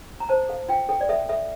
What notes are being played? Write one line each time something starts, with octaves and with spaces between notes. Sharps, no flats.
A#5
C5 A5
A4 F5
F4 G5
A4 G5
D5
A4 E5
A4 E5